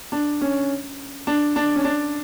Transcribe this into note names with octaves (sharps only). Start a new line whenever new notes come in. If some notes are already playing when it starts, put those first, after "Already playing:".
D4
C#4
D4
D4
C#4
D4